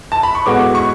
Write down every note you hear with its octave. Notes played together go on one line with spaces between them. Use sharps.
A5
B5
C#6
A2 G#3 B3 F#4 D6
C#6